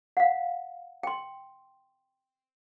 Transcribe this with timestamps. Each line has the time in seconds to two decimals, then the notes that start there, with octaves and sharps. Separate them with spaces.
0.17 F5 F#5
1.03 G5 C6